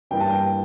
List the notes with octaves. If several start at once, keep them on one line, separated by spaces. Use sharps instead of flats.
A1 G2 E3 G3 A#3 G5
A5
G5